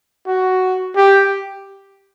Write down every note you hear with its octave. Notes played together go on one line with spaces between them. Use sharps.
F#4
G4